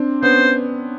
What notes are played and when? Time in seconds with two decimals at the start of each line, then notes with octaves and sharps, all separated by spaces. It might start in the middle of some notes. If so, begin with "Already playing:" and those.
Already playing: C4 D4
0.22 B3 C#4 C5